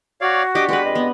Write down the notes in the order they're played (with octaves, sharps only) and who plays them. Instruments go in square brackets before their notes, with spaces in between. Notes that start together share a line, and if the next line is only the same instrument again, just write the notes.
[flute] F#4 [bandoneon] C#5 D5 F5
[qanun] D4 G4 [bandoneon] D#5 D6
[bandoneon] G#3 B3 [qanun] G4 B4
[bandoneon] F2 G#3 [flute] D#5
[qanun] B3